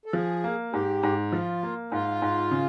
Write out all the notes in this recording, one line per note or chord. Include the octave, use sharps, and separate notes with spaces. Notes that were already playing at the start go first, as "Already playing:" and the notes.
A4
F3 G#4
A#3
G#2 G4
G#2
F3 F4
A#3
G#2 F4
G#2
C#3